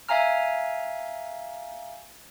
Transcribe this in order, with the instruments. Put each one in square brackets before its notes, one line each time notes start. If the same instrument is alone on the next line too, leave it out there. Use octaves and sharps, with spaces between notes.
[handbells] E5 F5 G#5 A#5 F6